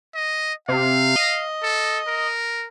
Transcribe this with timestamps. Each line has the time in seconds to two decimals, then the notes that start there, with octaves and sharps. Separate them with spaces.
0.14 D#5
0.68 C3 F5
1.16 D#5
1.63 A4
2.07 A#4